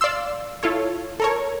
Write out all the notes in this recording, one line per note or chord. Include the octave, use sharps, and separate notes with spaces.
D5 F5 C6 E6
E4 F4 A4 C#5
A4 A#4 C#5